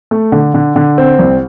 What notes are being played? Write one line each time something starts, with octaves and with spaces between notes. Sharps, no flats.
A3
D3
D3
D3
C4
C2